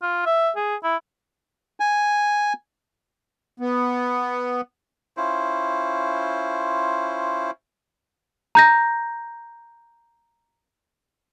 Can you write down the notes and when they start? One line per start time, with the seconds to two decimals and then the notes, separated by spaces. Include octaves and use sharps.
0.02 F4
0.26 E5
0.56 G#4
0.84 E4
1.80 G#5
3.60 B3
5.17 C#4 E4 F4 C5
8.55 A#5 G6 A#6